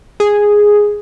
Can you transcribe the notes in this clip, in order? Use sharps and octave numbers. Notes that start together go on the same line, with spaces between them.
G#4